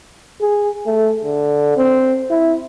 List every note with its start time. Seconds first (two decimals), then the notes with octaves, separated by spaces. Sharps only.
0.42 G#4
0.86 A3
1.24 D3
1.77 C4
2.30 E4